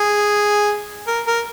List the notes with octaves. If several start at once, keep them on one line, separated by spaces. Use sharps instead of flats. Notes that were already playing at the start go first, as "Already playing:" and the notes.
Already playing: G#4
A#4
A#4